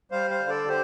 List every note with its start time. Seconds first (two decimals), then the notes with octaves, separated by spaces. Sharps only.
0.11 G3 C5 F5
0.30 C5 F5
0.40 D3
0.49 A4 D5
0.68 D3 G4 C5